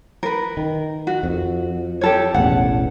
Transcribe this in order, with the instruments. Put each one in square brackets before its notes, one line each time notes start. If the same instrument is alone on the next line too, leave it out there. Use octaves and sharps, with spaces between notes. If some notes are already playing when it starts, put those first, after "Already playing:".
[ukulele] A#4 B4
[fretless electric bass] D#3
[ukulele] F#4
[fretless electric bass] F2
[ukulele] G4 A4 C#5
[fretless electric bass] E1 A1 E2 [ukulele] F#5